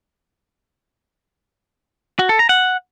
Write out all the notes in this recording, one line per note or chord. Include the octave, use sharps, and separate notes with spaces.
F#4
A4
A#5
F#5